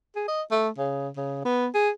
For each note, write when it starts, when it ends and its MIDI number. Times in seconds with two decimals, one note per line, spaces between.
0.16 0.24 68
0.28 0.42 75
0.51 0.69 57
0.78 1.09 49
1.16 1.45 49
1.45 1.68 59
1.75 1.90 68